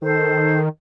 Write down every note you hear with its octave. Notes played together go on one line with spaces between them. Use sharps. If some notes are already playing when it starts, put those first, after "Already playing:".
D#3 A4 C5